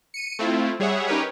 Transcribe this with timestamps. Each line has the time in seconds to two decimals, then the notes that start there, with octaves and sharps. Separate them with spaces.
0.14 C#7 D#7
0.39 A3 C4 E4 F4
0.80 G3 G#4 C#5 E5 F#5
1.07 C#4 D#4 G4 A#4 B4 C#5